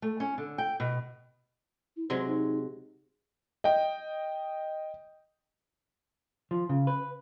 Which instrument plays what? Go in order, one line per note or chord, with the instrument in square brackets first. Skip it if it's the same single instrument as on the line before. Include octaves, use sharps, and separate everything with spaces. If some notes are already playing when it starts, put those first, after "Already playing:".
[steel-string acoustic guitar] A3
C#4
D3
G5
B2
[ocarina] E4
[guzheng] C3 F#3 G#3 [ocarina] C5
[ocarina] D#4
[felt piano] D#5 G5
[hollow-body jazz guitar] F3
C#3
B4